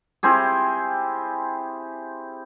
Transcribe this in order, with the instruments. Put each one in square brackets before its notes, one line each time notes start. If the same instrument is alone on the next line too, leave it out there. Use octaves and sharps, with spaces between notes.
[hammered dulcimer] C4 E4 G4 G#4